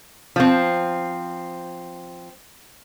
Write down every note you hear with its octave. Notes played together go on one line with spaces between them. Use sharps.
F3 C4